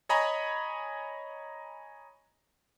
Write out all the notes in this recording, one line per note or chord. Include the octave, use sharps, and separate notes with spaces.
C#5 D#5 G#5 A#5 B5